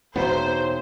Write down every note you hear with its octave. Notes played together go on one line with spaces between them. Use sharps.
E1 B3 D#4 C5 C#5 A#5